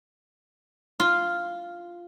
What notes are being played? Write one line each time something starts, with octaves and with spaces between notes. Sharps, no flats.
F4